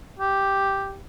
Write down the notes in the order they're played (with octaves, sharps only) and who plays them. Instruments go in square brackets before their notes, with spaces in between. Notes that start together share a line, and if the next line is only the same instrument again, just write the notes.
[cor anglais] G4